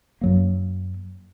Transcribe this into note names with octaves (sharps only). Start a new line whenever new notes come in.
F#2 F#3 A#3